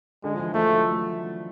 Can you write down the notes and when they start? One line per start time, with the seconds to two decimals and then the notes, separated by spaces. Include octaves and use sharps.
0.24 D3 G#3
0.33 F3
0.39 E3
0.53 F3 A3
0.69 F#3